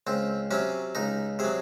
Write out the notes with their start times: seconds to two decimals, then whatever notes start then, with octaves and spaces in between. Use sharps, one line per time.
0.07 C#2 C4
0.51 C3 F#3 C#4
0.95 C#2 D#4
1.39 C3 F#3 G#4